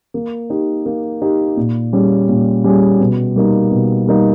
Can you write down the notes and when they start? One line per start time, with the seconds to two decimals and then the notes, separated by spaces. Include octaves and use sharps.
0.14 A#3
0.50 D#4 G4
0.86 A#3
1.22 D#4 G4
1.57 A#2
1.93 G3 C#4 G#4
2.29 A#2
2.64 G3 C#4 G#4
3.00 B2
3.36 G3 A#3 D#4
3.71 B2
4.07 G3 A#3 D#4